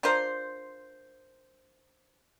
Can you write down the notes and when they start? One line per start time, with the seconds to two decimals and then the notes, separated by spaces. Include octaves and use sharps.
0.03 D4 F4 A#4 C5